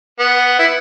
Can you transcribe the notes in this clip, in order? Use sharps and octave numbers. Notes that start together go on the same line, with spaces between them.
B3
E4